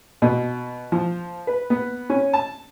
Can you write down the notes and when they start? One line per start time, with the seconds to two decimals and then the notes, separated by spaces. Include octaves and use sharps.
0.22 B2
0.92 F3
1.47 B4
1.70 B3
2.10 C#4
2.33 A5